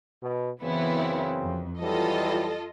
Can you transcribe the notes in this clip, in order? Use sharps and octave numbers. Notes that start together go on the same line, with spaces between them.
B2
F#2 C#3 E3 B3 C4 E4
F2
E3 F#3 G3 F4 A4 D#5